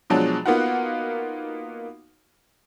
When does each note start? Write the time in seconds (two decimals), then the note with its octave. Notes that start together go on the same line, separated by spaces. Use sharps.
0.10 B2 F3 F#3 G#3 D4
0.46 A#3 B3 D#4 F4 F#4 F#5